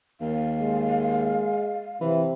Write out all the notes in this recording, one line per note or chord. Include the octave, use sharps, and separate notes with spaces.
D#2 F5
G#3
C3 E3